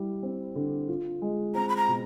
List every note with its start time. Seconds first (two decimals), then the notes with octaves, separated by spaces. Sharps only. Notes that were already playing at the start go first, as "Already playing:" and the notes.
Already playing: G3 E4
0.23 C4
0.55 D3
0.88 F4
1.22 G#3
1.54 C4 A#5
1.69 B5
1.77 A#5
1.88 B2